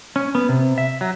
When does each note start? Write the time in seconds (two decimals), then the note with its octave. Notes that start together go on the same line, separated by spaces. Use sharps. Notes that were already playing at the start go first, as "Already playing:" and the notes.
0.16 C#4
0.35 B3
0.49 C3
0.78 E5
1.01 F#3